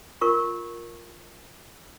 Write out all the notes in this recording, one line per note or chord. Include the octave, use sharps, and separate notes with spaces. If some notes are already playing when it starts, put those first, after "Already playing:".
F4 A#4 C#6